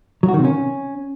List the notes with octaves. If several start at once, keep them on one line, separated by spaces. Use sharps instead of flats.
F#3
F#4
D#3
C3
C#4